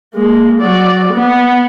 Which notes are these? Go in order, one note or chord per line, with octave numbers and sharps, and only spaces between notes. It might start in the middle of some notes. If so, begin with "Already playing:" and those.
G#3 A#3
F#3 D5
B3